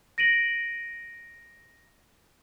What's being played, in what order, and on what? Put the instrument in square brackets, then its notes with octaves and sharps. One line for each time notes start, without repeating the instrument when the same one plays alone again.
[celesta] A#6 D7 D#7 F#7